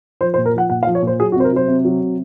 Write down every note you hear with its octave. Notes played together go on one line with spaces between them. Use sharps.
F3 C5
C5
A#2
A#4
F3 F#5
A#2 F#5
F5
F3
C#5
A#2 C5
F#3 G#4
F#4
C3 C5
A#4
F#3 C5
C3
F#3
C3